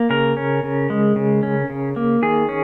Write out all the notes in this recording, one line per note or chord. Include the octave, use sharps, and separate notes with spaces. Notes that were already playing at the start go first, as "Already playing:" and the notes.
Already playing: A#3
C#3 A#4
C#4
C#3
G#3
C#3
C#4
C#3
A#3
D#3 G#4
C#4